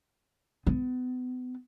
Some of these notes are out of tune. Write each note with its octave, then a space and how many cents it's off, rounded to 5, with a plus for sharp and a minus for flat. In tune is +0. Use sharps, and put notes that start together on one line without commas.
B3 +35